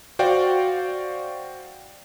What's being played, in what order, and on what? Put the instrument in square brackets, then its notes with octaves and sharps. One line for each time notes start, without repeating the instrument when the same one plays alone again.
[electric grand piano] F#4 C5 D5 F5 G5